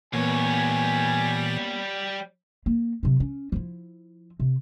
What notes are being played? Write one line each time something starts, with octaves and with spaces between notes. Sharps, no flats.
A#2 E3 G3 A#3 B3 C#5 G#5
A#3
C3 F#3
C#4
F3 E4
C3